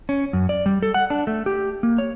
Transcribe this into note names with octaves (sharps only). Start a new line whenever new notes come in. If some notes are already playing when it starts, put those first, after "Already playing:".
C#4
F#2
D5
G3
A4
F#5
D4
A3
G4
A#3
C#5